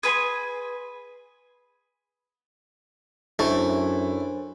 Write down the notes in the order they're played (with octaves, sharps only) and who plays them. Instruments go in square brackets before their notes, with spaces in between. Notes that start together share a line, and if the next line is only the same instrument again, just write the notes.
[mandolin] G#4 B4 G#5 C6
[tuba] F#2 [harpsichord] A3 [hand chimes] D4 C5 [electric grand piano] E4